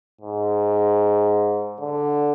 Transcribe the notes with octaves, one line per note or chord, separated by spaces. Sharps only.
G#2
D3